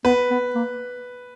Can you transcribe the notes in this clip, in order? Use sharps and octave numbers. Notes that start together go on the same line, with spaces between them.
B3 B4
B3
A#3